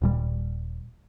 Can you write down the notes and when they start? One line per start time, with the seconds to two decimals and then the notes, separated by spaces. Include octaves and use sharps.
0.02 D#1 A#2 G3